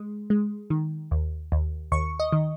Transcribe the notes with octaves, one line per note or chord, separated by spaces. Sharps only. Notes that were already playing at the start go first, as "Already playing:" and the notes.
Already playing: G#3
G#3
D#3
D#2
D#2
D#2 C#6
D#5
D#3